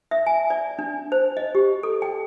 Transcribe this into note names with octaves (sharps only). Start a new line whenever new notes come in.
E5
G#5
D5
D4
C5
D#5
G4
A4
G5